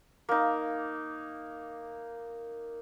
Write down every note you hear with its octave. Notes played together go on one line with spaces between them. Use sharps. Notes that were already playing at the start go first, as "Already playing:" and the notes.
A#3 D#4